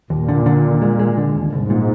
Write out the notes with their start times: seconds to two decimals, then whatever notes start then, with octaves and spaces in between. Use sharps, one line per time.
0.10 D#2 A#2
0.28 D3
0.46 D3
0.64 D#2
0.82 G#3
0.99 G#3
1.17 D3
1.35 D#2
1.52 C2 G#2
1.70 A#2